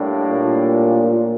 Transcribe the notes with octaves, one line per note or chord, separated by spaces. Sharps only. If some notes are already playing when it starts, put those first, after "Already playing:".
Already playing: A2 G3 A#3 D4
A#2